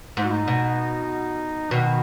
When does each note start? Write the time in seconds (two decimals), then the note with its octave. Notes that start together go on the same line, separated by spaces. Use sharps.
0.17 G#2
0.24 F#4
0.32 D#4
0.48 B2
1.71 B2 D#3